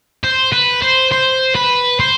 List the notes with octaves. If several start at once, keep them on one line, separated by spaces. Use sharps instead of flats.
C5
B4
C5
C5
B4
C5